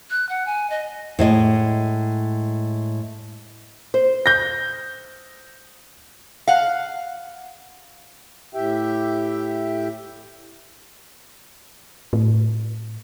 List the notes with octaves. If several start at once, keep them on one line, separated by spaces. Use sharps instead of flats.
F#6
F#5
G#5
D#5
A2 G#3 D#5
C5
G6 A#6
F5 F#5
A2 G4 E5 G5
A2